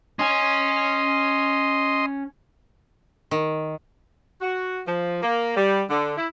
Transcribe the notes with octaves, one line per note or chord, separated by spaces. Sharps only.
C#4 D#5 G#5 C6
D#3
F#4
F3
A#3
G3
D3
E4